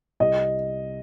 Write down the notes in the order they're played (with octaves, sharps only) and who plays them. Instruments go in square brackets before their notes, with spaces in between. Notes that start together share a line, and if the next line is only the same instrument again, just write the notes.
[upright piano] C2 D#5